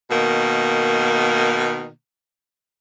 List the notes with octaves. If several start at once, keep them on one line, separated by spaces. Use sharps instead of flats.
B2 D#3 A#3